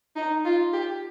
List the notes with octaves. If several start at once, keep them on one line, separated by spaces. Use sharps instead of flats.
D#4
F4
G4